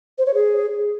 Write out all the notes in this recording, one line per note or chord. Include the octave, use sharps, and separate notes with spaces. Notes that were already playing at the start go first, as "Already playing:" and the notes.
C5
C#5
G#4